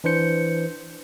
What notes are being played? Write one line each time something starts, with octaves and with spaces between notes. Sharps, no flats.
E3 D4 B4 C5 G6 C#7